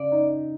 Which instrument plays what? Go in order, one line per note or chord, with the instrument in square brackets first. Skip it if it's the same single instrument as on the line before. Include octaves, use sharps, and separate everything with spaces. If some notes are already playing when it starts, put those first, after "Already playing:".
Already playing: [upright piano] C#3 [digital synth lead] D5
[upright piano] D#4